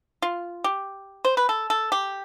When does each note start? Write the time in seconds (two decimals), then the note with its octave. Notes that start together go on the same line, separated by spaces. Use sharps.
0.22 F4
0.64 G4
1.25 C5
1.37 B4
1.49 A4
1.70 A4
1.92 G4